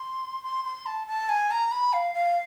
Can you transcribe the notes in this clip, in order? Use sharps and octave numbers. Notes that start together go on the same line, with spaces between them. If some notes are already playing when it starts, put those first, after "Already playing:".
Already playing: C6
C6
C6
A5
A5
G#5
A#5
B5
F5
F5